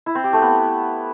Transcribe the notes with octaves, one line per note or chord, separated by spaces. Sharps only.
E4
C4
G4
A3
B3